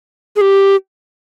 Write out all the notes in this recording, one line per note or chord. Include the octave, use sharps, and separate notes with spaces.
G#4
G4